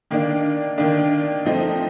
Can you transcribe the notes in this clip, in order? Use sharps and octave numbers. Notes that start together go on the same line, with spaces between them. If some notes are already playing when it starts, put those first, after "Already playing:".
D#3 A#3 D4
D#3 A#3 D4
F3 A3 C4 D#4